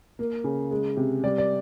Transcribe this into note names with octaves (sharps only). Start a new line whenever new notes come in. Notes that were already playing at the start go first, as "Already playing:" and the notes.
A#3
C#3
G#3
C3
G3 D5
D5